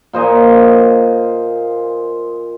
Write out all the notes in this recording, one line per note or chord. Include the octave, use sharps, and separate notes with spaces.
A#2 C5 D#5 G#5